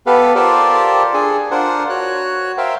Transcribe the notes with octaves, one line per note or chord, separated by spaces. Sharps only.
B3 G4 A4 B4 F5
F4 G4 A4 A#4 C5 D5
D4 G#4 A4 G#5
D4 F4 A#4 C5 F#5
F#4 C#5 F#6
A#4 C5 E5 F5 G5